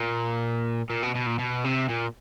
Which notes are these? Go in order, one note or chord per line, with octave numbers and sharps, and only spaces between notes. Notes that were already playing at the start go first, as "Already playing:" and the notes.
Already playing: A#2
A#2
B2
B2
A#2
B2
C3
A#2